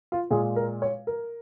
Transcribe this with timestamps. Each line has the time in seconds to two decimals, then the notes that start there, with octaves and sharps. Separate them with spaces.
0.12 F4
0.31 A#2 G#3 F4 G#4
0.56 A#4
0.82 C#5
1.07 A#4